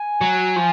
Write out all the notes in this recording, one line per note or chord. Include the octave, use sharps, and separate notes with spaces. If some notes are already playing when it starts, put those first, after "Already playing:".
Already playing: G#5
F#3
F3